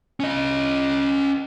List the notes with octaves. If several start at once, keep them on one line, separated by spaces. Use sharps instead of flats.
C#4 D#5